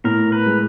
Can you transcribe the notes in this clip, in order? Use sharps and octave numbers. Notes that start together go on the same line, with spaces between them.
A2 A#4
B4
G#3